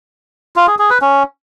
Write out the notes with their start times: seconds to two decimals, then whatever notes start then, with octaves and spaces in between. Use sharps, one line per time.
0.56 F4
0.67 G#4
0.79 G#4
0.90 B4
1.02 C#4